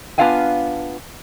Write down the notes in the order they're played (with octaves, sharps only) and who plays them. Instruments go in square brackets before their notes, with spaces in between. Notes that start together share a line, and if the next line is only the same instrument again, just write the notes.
[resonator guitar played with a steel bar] B3 D4 F4 F5 G5 G#5